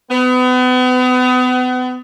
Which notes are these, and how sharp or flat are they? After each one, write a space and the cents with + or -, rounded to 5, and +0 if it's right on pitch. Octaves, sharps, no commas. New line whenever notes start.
B3 +35